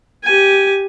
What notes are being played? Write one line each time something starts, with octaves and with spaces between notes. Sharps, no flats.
G4 G#5